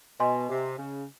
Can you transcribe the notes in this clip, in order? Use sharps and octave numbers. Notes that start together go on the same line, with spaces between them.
B2 D#5 G#5 C6
C3
C#3